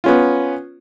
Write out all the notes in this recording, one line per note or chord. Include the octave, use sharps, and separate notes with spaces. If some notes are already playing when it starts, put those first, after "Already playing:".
B3 C#4 F4